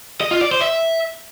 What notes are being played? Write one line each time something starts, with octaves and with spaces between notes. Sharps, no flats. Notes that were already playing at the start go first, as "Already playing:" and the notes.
D#5
F4
D5
C5
E5